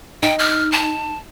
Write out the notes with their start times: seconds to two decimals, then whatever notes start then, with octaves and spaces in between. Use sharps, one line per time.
0.23 D#4 G5
0.39 F6
0.72 A5